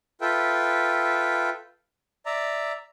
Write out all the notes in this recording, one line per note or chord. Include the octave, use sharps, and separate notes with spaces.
F4 A4 B4 E5 G5
D5 E5 A#5